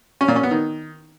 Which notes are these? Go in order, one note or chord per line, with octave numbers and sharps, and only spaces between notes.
C#4
A#2
C#4
B3
D#3